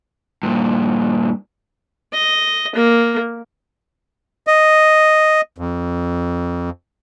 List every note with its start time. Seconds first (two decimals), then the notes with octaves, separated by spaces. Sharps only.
0.43 G2 A#2
2.13 D#5
2.76 A#3
4.47 D#5
5.58 F2